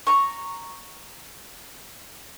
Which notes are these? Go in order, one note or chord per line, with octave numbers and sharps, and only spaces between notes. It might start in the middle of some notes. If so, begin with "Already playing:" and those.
A#5 C#6